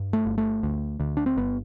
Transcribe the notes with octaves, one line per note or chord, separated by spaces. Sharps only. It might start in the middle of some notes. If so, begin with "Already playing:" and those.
Already playing: G2
A3
G1
A3
D2
D2
D4
C4
G1 B3